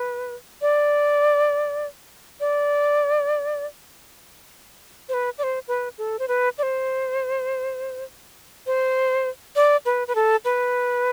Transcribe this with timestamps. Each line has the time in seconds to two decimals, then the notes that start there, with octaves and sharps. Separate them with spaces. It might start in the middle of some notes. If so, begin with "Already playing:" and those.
Already playing: B4
0.62 D5
2.40 D5
5.09 C5
5.14 B4
5.38 D5
5.43 C5
5.68 B4
5.98 A4
6.19 C5
6.28 B4
6.58 D5
6.63 C5
8.67 C5
9.56 D5
9.85 B4
10.08 B4
10.15 A4
10.45 B4